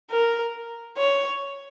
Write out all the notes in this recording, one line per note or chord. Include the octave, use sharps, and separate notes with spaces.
A#4
C#5